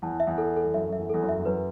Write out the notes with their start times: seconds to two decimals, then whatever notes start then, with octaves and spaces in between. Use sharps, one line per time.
0.02 E2 A5
0.20 E5
0.27 E2
0.38 A4
0.56 A4
0.65 E2
0.74 F#2 E5
0.89 F#2 E5
0.98 E2
1.10 E2 A4
1.22 F#2
1.29 E5
1.39 E2
1.46 F#2 B4